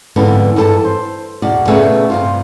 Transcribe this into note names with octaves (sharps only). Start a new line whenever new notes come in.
F2 G#2 D3 E3 B3 D4
G2 E3 A4 A5
C5
E2 B2 D5
A#2 C#3 A3 B3 G#4 E5
G2 C3 F4